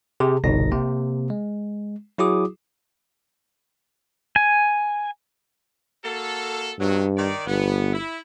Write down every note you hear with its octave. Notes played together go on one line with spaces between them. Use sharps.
C3 G4 G#4
G1 C2 B2 D#4 A#6
C3 A#3 C4
G#3
F#3 E4 F#4 G#4 D6 D#6
G#5
A#3 F#4 A4
G2 B2 D#3 F#3
D#3 D5
G1 B3
E4